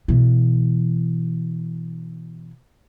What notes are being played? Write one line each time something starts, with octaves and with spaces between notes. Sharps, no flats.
B2 E3